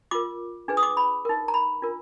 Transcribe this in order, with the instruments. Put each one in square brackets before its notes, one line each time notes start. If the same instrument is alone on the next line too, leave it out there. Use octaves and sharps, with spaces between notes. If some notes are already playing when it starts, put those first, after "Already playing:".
[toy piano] F4 A#4 D6
D4 G#4 B4
D#6
D6
B5
D#4 A#4
A#5
B5
D4 F4 A#4